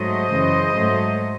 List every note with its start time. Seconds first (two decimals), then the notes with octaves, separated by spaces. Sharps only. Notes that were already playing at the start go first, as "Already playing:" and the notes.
Already playing: G#2 F#3 A3 C5 D#5
0.30 F#2 C#3 E3
0.75 G#2 F#3 A3